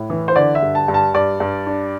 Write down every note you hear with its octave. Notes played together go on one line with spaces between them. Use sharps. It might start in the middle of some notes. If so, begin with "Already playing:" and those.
Already playing: A2
E3
C5
D3 D5
E5
G2
A5
G2
A5
G2 D5
G2
D4